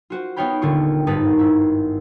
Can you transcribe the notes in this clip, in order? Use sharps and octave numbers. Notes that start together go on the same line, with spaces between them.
F4 F#4 C5
B3 D#4 C#5 F5 G5 B5
D#1 D3 F4 C#6
G#1 G2 D#4 B4 A5 B6
E4